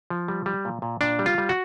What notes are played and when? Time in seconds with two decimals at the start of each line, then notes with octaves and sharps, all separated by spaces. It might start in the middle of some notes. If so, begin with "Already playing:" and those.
0.10 F3
0.28 G3
0.46 G3
0.65 A#2
0.82 A#2
1.01 A#2 D4
1.19 G3
1.26 F4
1.38 G3
1.49 F#4